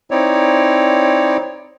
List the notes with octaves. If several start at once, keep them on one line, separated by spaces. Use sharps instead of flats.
C4 D#4 E4 C#5 D5